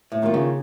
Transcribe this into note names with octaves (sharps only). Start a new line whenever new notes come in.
A2
D#3 A#3 F4
C#3